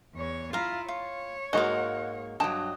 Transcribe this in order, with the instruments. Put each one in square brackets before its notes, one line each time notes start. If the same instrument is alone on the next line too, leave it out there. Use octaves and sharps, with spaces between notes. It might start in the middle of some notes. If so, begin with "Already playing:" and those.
[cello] E2 C#5
[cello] E4 F4 [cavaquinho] F5 A#5
[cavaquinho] F4 [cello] C#5
[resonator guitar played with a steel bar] G#2 A#3 [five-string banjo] G#3 F#4 D#5 [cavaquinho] F5 F#5
[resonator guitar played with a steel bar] G2 F#3 [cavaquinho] D#5 [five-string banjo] G5 A5